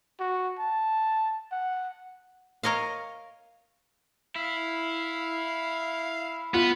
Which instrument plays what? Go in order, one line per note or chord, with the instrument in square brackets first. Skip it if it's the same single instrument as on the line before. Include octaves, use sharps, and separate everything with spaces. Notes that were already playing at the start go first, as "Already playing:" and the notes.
[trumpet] F#4
A5
F#5
[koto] A#4 C#5 D#5 F5
[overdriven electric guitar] E4 [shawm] F5
[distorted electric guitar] B3 [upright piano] F4